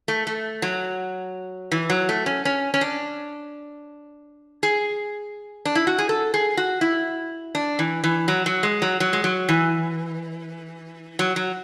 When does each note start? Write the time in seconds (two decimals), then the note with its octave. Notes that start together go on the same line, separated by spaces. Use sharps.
0.08 A3
0.27 A3
0.62 F#3
1.72 E3
1.90 F#3
2.09 A3
2.26 C#4
2.45 C#4
2.74 C#4
2.81 D4
4.63 G#4
5.65 D4
5.75 E4
5.87 F#4
5.98 G#4
6.09 A4
6.34 G#4
6.57 F#4
6.81 E4
7.55 D4
7.79 E3
8.04 E3
8.28 F#3
8.46 F#3
8.63 G#3
8.82 F#3
9.00 F#3
9.13 G#3
9.24 F#3
9.49 E3
11.19 F#3
11.36 F#3